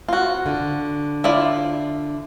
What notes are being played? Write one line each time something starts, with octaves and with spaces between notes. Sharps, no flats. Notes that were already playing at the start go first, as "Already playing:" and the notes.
C4 F4 F#4
D3
E4 F4 D5